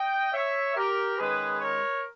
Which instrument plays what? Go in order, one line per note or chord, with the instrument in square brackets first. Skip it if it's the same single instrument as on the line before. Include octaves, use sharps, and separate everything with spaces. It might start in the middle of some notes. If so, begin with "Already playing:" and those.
Already playing: [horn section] D#5 G5
C#5 E5
G4 A#4
D#3 G#3 C#4 G#4 B4
A#4 C#5